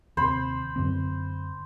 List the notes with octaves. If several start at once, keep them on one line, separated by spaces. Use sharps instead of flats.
D#2 C3 C5 B5
F#2 D3 C4